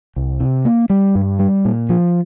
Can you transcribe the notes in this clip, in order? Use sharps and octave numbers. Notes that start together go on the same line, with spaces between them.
C2
C3
A#3
G3
G2
G3
A#2
F3